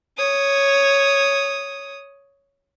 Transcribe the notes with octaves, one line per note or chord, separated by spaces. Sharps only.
C#5 D#6